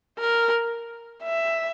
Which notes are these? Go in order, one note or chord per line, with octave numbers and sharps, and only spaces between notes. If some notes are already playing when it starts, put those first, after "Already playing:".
A#4
E5